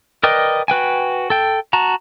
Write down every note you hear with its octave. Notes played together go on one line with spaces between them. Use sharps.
A#4 B4 D5 D#5 G5
F#4 B4 G5 G#5
A4 G5
F#4 A5 A#5